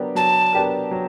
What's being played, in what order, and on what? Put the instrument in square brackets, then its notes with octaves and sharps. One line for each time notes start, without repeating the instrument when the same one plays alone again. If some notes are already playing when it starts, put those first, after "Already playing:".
Already playing: [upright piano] F#3 B3 D4 G4 A#4
[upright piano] F#3 [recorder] A5
[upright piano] B3 D4 G4 A#4
F#3